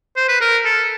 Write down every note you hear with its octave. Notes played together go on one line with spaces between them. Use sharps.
C5
B4
A#4
A4